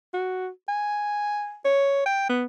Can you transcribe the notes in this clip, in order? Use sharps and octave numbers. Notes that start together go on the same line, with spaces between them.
F#4
G#5
C#5
G5
B3